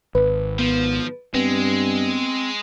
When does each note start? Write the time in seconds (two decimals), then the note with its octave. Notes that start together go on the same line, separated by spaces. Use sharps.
0.15 G#1 B4
0.59 F3 B3
1.34 G2 G#3 B3 C4